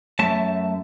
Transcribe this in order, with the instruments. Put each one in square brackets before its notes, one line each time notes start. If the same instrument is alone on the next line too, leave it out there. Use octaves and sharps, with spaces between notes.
[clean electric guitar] F#2 A3 E5 A5